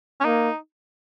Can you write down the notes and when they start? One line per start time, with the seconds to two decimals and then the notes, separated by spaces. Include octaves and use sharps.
0.21 C#4
0.25 A#3 D#4